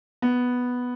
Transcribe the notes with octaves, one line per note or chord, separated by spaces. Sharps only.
B3